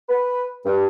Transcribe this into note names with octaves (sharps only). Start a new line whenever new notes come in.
B4
G2